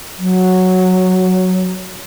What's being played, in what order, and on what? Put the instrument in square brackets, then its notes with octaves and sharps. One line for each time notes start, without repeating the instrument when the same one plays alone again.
[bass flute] F#3